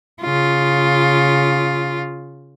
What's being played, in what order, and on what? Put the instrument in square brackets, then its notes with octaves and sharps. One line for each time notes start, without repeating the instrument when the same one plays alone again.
[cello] C#3 F4